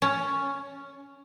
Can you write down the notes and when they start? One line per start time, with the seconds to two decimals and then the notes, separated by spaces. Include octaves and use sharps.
0.02 C#4